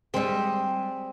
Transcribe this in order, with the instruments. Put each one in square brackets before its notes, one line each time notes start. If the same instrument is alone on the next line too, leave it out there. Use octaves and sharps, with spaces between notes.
[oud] G3 G#3 G#4 [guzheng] C4